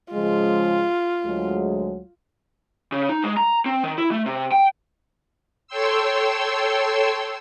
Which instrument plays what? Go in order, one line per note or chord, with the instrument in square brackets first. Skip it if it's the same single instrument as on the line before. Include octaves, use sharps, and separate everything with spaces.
[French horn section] C#3 F3 G#3 [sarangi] F4
[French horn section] D2 F#3 G#3
[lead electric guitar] C#3
D#4
G#3
A#5
C4
D#3
E4
A3
C3
G5
[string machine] A4 C#5 G5 C6 E6